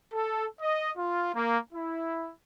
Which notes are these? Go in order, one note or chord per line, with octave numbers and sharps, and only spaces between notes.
A4
D#5
F4
A#3
E4